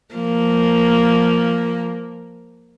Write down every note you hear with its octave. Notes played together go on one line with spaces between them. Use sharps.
F3 A#3